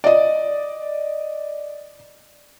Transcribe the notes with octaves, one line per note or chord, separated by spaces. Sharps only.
D5 D#5